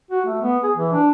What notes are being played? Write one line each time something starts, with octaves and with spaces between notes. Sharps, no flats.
F#4
A3
B3
G#4
E3
D4